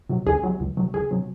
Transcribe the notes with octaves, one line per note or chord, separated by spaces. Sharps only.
C3 F#3
C#2 G#4
C3 F#3
C#2
C3 F#3
C#2 G#4
C3 F#3